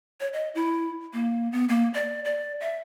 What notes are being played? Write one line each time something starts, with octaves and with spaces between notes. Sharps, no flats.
C#5
D#5
E4
A#3
B3
A#3
D5
D5
E5